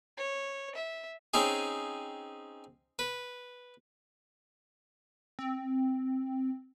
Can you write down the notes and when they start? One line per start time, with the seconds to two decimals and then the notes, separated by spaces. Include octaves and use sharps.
0.17 C#5
0.75 E5
1.34 C4 C#4 D#4 G#4
2.99 B4
5.39 C4